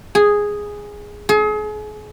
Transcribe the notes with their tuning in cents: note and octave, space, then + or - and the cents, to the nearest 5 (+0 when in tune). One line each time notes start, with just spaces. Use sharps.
G#4 -5
G#4 +35